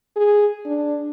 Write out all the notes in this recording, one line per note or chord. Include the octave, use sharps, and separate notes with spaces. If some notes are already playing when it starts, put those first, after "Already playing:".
G#4
D4